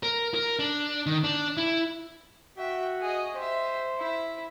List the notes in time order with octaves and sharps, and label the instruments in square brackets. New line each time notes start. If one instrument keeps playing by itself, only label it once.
[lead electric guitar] A#4
A#4
D4
D#3
D4
E4
[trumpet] F#4 [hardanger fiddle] E5 G5
[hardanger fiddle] G#4 D#5
[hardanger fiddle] G4 E5 [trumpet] C5
[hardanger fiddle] E4 E5